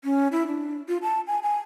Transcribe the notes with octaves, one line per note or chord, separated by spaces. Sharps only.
C#4
E4
D4
F4
A5
G#5
G#5